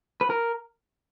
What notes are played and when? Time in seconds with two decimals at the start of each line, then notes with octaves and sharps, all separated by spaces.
0.21 B4
0.30 A#4